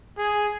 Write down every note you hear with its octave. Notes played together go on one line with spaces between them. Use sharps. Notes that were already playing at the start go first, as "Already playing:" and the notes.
G#4